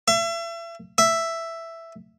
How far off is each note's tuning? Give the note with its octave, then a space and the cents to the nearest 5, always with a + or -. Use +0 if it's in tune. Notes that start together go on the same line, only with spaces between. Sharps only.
E5 +35
E5 +5